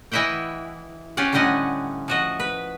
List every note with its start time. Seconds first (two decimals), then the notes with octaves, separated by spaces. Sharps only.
0.12 E3 E4 D#5 E5 F#5 G5
1.17 C#4 F4 G4 F#5
1.33 A2 D3 G3 C#4 D#5 F#5
2.08 F3 F#4 D#5
2.40 B4